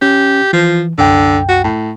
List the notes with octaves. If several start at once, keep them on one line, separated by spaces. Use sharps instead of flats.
C#4 G4
E3 F3
C2 F#2 D3 G5
F#4
A2